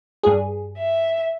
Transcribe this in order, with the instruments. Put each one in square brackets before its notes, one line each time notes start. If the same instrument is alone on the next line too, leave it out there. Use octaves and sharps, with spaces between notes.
[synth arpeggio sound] G2 G#4
[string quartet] E5